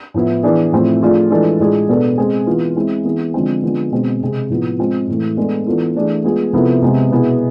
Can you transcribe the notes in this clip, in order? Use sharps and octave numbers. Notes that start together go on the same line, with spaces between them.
A2 F3 B3 E4
E3 B3 D4 G#4
A2 F3 A3 C4 E4
F3 A3 D4 F4 G#4
E3 G#3 D4 F4 A4
A2 G#3 D4 F4 G#4
B2 B3 D4 A4
G#3 C4 G#4
E3 B3 F4
G#3 C4 E4 G#4
E3 B3 E4 G#4
D3 F3 G#3 C4
D3 F3 G#3 B3
B2 G#3 C4 G#4
C3 G#3 C4 G#4
A2 F3 B3
G#3 C4 F4 G#4
A2 E3 A3
G#3 B3 D4 A4
E3 B3 D4 F4 A4
E3 A3 D4 G#4
G#3 B3 F4 G#4
C3 F3 B3 E4 A4
C3 G#3 B3
B2 B3 E4 G#4